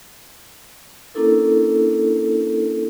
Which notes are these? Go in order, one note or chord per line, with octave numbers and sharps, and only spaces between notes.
A#3 C#4 D4 E4 A4 A#4